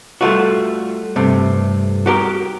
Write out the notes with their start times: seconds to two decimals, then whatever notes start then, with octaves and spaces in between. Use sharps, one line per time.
0.21 G3 A3 F4 F#4
1.16 G2 C3 A3
2.06 F#4 G4 A#4